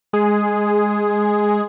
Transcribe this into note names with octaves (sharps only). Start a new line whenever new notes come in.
G#3 G#4